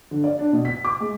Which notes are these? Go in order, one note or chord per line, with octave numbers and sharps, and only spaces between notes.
D3
D5
D4
B2
B6
D6
G#3